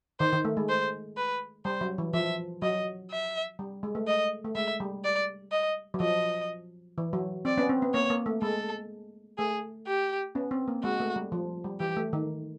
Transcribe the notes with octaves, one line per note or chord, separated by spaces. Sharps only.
D#3 C5
D#3
A3
G#3
C5
B4
G3 C5
F#3
E3
F3 E5
F#3 D#5
E5
G3
G#3
A3
D#5
A3
G#3 E5
G3
D5
D#5
F#3
F3 D#5
E3
F#3
C4 D5
B3 C#4
C4
B3
A#3 C#5
A#3
A3
G#3 A4
A3 G#4
G4
B3 C#4
C4
A#3
G#3 F#4
A3
G3
F3
G3
E3 G4
A3
D#3